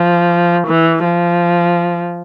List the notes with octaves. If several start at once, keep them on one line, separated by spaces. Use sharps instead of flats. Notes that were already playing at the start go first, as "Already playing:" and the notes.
Already playing: F3
E3
F3